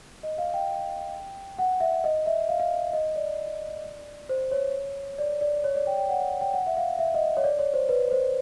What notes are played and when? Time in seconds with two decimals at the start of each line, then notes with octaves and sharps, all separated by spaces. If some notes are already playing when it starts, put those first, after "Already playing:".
0.23 D#5
0.38 F5
0.54 G5
1.59 F#5
1.80 E5
2.04 D#5
2.26 E5
2.49 F5
2.60 F5
2.93 D#5
3.16 D5
4.29 C5
4.51 C#5
5.19 D5
5.41 D5
5.64 C#5
5.75 D5
5.87 G5
5.98 G5
6.09 F#5
6.41 G5
6.54 F#5
6.67 E5
6.77 F5
6.99 E5
7.14 D#5
7.37 C#5
7.44 D5
7.59 C#5
7.74 C5
7.89 B4
8.12 C5